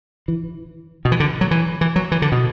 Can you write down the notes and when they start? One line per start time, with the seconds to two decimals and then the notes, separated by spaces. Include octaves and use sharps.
0.28 E3
1.05 B2
1.12 E3
1.20 D3
1.41 F#3
1.51 E3
1.81 E3
1.96 F#3
2.12 E3
2.22 D3
2.32 B2